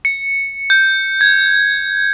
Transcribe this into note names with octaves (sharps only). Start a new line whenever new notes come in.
C#7
G6
G#6